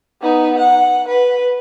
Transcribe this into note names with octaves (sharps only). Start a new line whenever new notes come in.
B3 D#4
F#5
B4